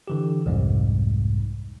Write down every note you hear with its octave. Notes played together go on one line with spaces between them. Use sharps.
D3 E3 G4
C2 F2 G#2